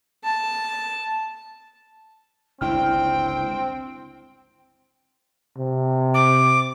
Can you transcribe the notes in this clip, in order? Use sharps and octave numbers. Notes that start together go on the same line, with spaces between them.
A5
G1 C#2 C4 D4 E4 G5 F6
C3
D6